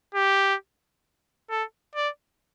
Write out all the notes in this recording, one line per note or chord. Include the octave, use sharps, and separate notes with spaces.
G4
A4
D5